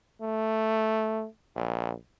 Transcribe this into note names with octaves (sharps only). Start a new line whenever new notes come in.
A3
A#1